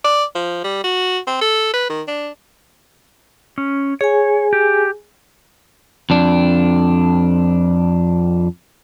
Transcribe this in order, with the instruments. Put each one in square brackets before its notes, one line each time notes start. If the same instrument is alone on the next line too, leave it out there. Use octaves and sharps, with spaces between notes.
[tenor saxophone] D5
F3
G3
F#4
C4
A4
B4
D#3
D4
[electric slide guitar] C#4
[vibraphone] G#4 G#5 [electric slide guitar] C#5
[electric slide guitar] G4
[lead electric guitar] F2 D4